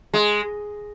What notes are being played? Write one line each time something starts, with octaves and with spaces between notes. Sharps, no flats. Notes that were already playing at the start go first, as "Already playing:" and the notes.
G#3